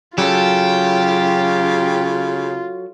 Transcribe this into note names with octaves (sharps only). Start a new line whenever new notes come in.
C#3 F#3 F4 G4 A4